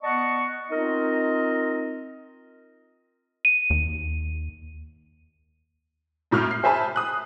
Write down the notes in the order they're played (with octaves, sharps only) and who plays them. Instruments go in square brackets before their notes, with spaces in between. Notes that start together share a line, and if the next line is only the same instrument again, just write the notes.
[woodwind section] B3 D5 D#5 F#5 A5 C#6
C4 D#4 F4 A#4 D#5
[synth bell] D#7
[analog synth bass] D#2
[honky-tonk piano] F#2 A2 C#6 F6 G6
C7
G#4 C5 E5 G#5 A5 B5
D#6 F#6